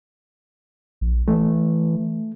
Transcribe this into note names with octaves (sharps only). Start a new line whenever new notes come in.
A#1
E3 A3